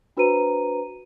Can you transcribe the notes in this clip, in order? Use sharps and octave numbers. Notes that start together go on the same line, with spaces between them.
D4 F#4 B4 C5 A#5 D#7